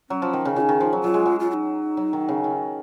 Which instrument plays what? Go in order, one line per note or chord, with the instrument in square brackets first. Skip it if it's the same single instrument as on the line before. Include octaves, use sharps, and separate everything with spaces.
[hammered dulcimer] F#3 [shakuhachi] C#4
[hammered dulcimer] F3
D#3
C#3
[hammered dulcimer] C#3 [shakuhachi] F4
[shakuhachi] D#4
[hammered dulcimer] D#3
F3
F#3
[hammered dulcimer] F#3 [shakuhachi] F4
[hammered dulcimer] G#3
F#3
[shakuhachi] F4
F4
D#4
[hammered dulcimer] F#3
D#3
C#3
D#3